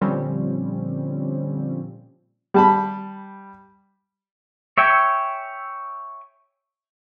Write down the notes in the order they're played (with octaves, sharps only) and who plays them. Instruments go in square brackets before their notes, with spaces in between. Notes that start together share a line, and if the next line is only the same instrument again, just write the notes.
[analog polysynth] A#2 D3 F3 G3 C4 C#4
[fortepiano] G3 A5 B5
[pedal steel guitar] C#5 E5 G5 G#5